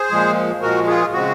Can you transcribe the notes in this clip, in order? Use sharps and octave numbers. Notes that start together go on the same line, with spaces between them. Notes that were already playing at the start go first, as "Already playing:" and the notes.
Already playing: G#4 C5
A#2 F3 G#3
A#2 F3 G#3 F#4 A#4
F4 G#4
C#3 G#3 C4 F#4